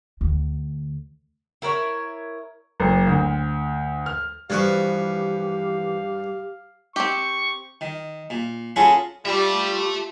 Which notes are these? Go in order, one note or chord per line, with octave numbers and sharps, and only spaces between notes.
D2
E4 A#4 C5 C#5
F#1
D2
F6
G2 E3 F3 F#4 G4 B4 F5 C#6
C4 G4 C#6
D#3
A#2
C#4 F4 F#4 G#4 A4 B4
G3 F4 G4 E5 A5